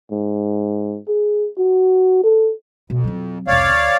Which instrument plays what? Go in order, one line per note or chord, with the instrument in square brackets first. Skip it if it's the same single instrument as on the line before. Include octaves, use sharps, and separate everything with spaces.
[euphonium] G#2
G#4
F#4
A4
[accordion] F2 [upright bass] B2
[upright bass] F#3 C4
[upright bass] C2 F2 [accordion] C#5 D5 F5
[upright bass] D2